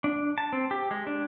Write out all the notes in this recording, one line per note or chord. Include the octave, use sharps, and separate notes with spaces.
D4
A5
C4
G4
G#3
D4